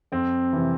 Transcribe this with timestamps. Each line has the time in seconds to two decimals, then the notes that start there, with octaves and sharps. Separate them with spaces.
0.12 F2 C4
0.53 C3 E3